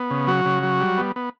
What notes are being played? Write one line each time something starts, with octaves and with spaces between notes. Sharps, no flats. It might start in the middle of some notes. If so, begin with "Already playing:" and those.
Already playing: B3
C#3
F#3 F#4
C#3
F#3
G3
B3
B3